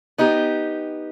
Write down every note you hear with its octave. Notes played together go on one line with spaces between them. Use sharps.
B3 D#4 G4